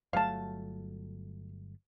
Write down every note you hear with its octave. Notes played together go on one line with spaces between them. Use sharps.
G1 F#3 A3 F5 A5